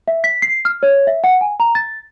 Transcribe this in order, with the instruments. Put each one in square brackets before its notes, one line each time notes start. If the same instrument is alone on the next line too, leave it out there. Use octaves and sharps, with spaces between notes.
[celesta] E5
B6
C7
F6
C#5
E5
F#5
G#5
A#5
A6